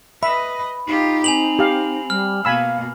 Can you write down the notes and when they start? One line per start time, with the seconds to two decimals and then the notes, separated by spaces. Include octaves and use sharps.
0.23 B4 D#5 E5 B5
0.88 D#4 F4 G4
1.24 C4 G#5 F7 F#7
1.59 G4 F5
2.10 G3 F6
2.45 B2 A#3 F5 G#5 B5 E6